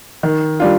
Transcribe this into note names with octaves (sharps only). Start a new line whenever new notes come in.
D#3
G3 D4 F4